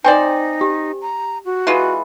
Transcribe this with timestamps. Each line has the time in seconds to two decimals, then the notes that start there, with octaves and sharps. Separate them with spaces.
0.04 C4 D#4 C5 D5 G5 G#5
0.61 G4
1.02 A#5
1.45 F#4
1.67 E3 G#3 F4